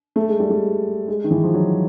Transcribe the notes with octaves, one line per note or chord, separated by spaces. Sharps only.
A3
G#3
G3
G3
G#3
D#3
E3
F3
F#3